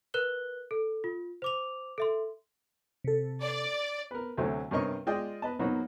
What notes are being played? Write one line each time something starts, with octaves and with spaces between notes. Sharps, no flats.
A#4 B4 F#6 G7
A4
F4
C5 D6 F7
A4 E5 C6
C3 A4
D5
A#4 B4
D2 C3 F#3 A3
G2 C3 C#4 A#4 D#5 C#6
G#3 F4 D5 D#5 G5
B4 D#5 A5
F#3 A#3 B3 D#4 F#4